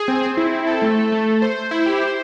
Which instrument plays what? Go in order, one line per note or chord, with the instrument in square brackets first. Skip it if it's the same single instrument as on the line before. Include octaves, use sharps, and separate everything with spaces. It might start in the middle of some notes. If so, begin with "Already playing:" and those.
Already playing: [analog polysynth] G#4
C4
C4
E4
C4
A4
A3
A4
A3
A3
C5
C5
E4
G4
C5